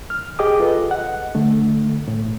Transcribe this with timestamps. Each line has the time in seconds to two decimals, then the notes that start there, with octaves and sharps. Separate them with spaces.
0.10 F6
0.39 G4 G#4 D#5 G5 D6 D#6
0.60 F4 A4 B4 D#5
0.91 D#5 F#5
1.35 D3 A3
2.08 A2